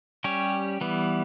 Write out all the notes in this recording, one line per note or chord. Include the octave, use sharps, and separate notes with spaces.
G3 C#4 G4 C#5
E3 G3 B3